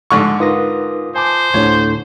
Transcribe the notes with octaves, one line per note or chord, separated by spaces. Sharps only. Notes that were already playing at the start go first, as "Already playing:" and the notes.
G#2 D3 C#6
D#4 F4 A#4 B4 D#6 A#6
C5 G#5 A5 D6
D2 A2 D3 C#5